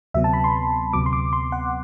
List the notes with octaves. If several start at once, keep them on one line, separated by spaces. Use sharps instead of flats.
D2 C3 F#3 B3 E5
A5
B5
C6
D2 C3 F#3 B3 D6
C6
D6
C6
F#5